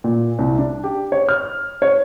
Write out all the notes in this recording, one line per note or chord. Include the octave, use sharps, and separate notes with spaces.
A#2
C2
D4
G4
C#5
F6
C#5